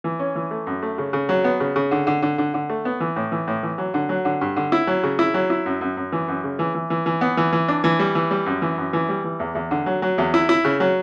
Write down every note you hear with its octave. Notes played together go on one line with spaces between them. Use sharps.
E3
C#4
E3
A3
F#2
A3
C#3
C#3
F#3
B3
C#3
C#3
D3
D3
D3
D3
D3
A3
B3
E3
A2
E3
A2
E3
F#3
D3
F#3
D3
G2
D3
E4
F#3
C#3
E4
F#3
E4
F#2
F#2
F#2
E3
F#2
C#3
E3
E3
E3
E3
B3
E3
E3
D4
E3
G3
E3
G3
F#2
E3
F#2
E3
G3
E3
E2
E2
D3
F#3
F#3
E2
E4
E4
C#3
F#3